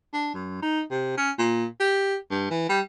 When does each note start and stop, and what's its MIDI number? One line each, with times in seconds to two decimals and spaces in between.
0.14 0.33 62
0.34 0.58 42
0.62 0.81 63
0.91 1.16 48
1.18 1.31 61
1.38 1.66 46
1.80 2.16 67
2.31 2.46 43
2.51 2.65 52
2.69 2.80 55